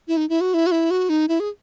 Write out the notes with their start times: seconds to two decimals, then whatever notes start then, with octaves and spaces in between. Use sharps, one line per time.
0.08 E4
0.17 D#4
0.29 E4
0.41 F#4
0.54 E4
0.66 F#4
0.72 E4
0.91 F#4
1.09 D#4
1.28 E4
1.40 G#4